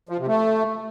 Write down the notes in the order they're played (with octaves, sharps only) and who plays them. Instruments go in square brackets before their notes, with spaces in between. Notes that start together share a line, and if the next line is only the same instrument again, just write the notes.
[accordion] F3
C3
A3